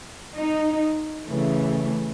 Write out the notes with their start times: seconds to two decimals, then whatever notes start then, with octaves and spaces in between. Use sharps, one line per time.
0.36 D#4
1.26 C#3 E3 A3